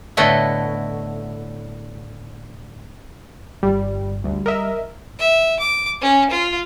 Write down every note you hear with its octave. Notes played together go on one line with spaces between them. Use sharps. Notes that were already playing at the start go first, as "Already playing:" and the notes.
A2 D3 A3 B3 E4 D#5
G1 G3
D2 G3
A#4 D#5 E5
E5
D6
C#4
F4